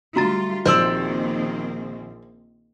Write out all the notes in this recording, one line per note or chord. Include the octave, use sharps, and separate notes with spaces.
D3 G3 A3 F4 F#4 A#5 A6
A#1 D#3 A#3 C4 C5 D5 E6